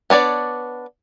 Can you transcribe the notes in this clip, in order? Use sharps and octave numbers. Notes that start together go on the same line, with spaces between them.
B3 D4 C#5 D5